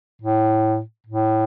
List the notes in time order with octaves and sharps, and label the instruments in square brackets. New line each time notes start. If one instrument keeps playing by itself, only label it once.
[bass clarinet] A2
A2